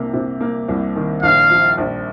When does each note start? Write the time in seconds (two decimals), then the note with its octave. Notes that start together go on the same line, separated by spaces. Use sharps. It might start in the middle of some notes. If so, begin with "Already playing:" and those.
Already playing: C2 C3 A#3
0.13 C3
0.41 A#3
0.68 C2
0.96 D#3
1.23 A#1 F5
1.50 F3
1.78 A#1